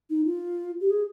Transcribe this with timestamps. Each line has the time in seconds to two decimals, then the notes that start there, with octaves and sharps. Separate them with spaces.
0.10 D#4
0.26 F4
0.81 G4
0.90 G#4